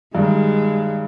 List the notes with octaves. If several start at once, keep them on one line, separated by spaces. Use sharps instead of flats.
G2 D#3 G3 G#3